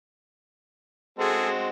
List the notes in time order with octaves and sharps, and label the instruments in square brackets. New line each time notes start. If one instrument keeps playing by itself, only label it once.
[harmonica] G#3 C4 F#4 [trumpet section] G#4 A4